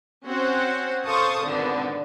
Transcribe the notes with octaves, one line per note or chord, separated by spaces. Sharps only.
C4 C#4 F#4 C5 F#5
A4 C5 F5 A5 C#6 D#6
G#1 D3 B3 C4 D5